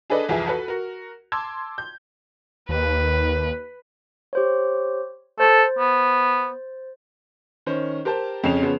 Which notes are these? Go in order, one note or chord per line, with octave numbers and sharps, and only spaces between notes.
D4 G#4 A4 B4 D5 D#5
C2 F2 E3 G#4 E5
F#4 A4 B4
F#4 A#4
A5 C6 D6 E6 G#6
G6
D#2 B4
G4 C5 C#5
A4 C5 A6
B3
D#3 C#4 C5
G4 A#4 C5 A5
F2 C#3 C#4 C7 E7 F7
C#3 F3 B3 C#4